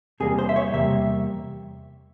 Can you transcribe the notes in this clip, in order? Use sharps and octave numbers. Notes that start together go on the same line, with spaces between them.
E2 C3 G3 A#3 G#4
C5
E5
C#5
E2 C3 G3 A#3 E5